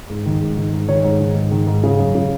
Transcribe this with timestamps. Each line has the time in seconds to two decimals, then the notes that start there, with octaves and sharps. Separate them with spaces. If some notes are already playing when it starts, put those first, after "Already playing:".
0.10 G#2
0.26 D#3
0.41 G#2
0.57 D#3
0.73 G#2
0.89 D#3 C#5
1.04 G#2
1.20 D#3
1.36 G#2
1.52 D#3
1.67 G#2
1.83 C#3
1.99 F#2
2.15 C#3